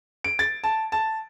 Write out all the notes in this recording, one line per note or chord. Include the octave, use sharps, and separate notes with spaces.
D7
A6
A5
A5